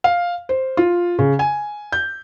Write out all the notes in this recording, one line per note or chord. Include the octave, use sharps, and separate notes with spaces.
F5
C5
F4
C#3
G#5
G6